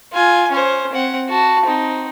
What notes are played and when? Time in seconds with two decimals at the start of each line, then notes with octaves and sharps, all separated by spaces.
0.12 F4 G#5
0.51 C#4 C5
0.92 C4 F#5
1.29 F#4 A5
1.65 C4 D#4